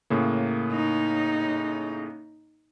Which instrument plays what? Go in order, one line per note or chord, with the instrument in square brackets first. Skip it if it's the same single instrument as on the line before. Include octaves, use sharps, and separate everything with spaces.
[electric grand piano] A2 C#3 A#3
[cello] D#4